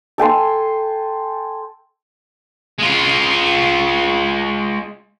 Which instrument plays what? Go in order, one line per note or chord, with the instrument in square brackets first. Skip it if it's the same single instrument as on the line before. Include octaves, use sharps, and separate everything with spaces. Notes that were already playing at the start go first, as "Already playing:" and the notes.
[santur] A4 G5 G#5 C6
[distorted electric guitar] G#3 F4